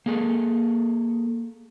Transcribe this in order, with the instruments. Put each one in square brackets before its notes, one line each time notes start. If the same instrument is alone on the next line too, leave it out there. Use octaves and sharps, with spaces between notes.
[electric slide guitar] A#3 G#4 A4